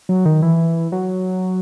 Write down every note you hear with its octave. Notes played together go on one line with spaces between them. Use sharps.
F#3
D#3
E3
F#3